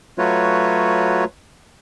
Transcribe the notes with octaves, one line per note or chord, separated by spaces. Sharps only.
F#3 A3 F4 F#4 B4 C#5